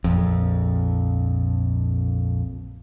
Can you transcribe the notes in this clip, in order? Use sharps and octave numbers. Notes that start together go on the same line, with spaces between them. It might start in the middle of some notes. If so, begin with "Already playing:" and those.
A#1 F2